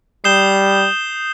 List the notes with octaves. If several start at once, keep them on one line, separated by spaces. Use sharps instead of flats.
G3 D#6 G6 C7 E7 G7